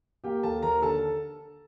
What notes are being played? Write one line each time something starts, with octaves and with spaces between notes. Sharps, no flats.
A#3 G4 G5
D#2 A4 A5
D#2 A#4 A#5
D3 A4 A5